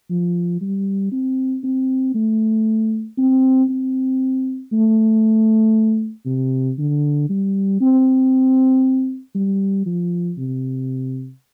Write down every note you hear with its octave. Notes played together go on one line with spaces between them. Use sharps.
F3
G3
C4
C4
A3
C4
C4
A3
C3
D3
G3
C4
G3
F3
C3